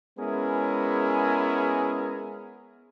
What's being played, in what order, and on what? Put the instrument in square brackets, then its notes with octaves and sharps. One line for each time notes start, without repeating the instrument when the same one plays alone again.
[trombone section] G#3 B3 C#4 E4 G#4 A#4